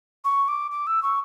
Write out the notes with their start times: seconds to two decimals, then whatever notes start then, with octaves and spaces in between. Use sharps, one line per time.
0.25 C#6
0.48 D6
0.71 D6
0.87 E6
1.03 C#6